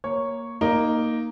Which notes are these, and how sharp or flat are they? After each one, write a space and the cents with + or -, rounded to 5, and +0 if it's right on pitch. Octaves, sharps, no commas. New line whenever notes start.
A#3 +0 C#5 +0
A#3 +0 D#4 +0